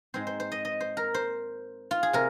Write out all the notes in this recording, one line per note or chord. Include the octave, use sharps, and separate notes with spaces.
G#2 G#3 C4 C5
C5
C5
D#5
D#5
C5
A#4
C5
F4
G#4
C3 A#4